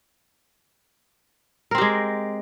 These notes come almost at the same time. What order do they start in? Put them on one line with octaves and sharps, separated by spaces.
A#4 C4 G4 G#3